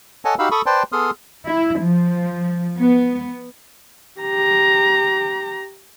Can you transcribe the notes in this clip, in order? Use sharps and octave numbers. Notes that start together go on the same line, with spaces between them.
A4 C#5 D#5 F#5 G#5 A5
D#4 F#4 G4 F5 B5 E6
A4 B5 C#6 D#6
B4 C5 D5 G5 A5 C6
B3 G#4 A4 C6 D#6 F6
E4
F3
B3
G4 A#5